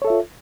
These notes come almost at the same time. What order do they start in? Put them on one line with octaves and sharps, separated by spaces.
C#5 A4 E5 F4